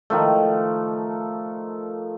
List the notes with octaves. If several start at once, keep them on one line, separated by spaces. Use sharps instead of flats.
D#3 F3 A3